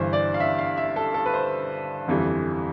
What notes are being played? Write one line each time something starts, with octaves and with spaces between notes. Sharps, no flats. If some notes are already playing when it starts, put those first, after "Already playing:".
Already playing: G1 G2 E3 C5
D5
F5
E5
F5
E5
A4
A4
B4
C5
G1 F2 E3 G3